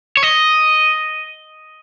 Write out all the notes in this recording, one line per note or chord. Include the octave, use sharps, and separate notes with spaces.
C#5
D#5